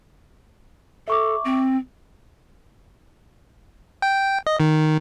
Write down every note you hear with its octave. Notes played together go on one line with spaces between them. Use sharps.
A4 E5 C#6 D6
C4
G5
D#5
D#3